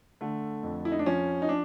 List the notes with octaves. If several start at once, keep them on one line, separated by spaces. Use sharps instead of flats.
D3 A3
F2
E4
D#4
D4
F3 C#4
D#4
D4